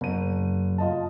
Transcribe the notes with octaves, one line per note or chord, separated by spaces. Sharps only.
F#1 F#2 D#7
F4 D#5 A5